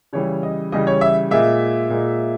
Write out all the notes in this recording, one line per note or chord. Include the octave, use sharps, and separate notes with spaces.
C#3 E3 G3 C#5
D#5
C#3 E3 G3 D#5
C#5
E5
A#2 G#3 E5
A#2 G#3